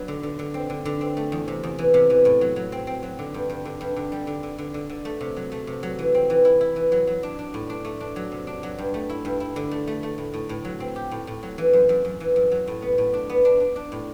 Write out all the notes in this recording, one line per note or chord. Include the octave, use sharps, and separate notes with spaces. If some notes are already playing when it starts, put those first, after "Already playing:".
Already playing: F#3 B3 D4
D3
D3
D3
C4
D3
D3
C4
A3
E2
C3
E2
E3
C3
E3
A2
F#3
F#3
C4
C4
F#3
D3
G2
G2
D3
G2
D3
G3
D3
D3
D3
D3
D3
A3
C3
F#3
A3
C3
F#3
E3
C4
E3
E4
E4
E3
F#3
F#3
D4
D4
A2
D4
A3
D4
F#3
C3
D4
F#3
G2
A3
E4
G2
E4
D3
A3
A3
A3
A2
A2
A2
F#3
C4
G4
A2
A2
F#3
E3
F#2
F#2
F#2
E3
F#2
F#3
A2
B3
A2
D4
B3
D4
D4
D4
A2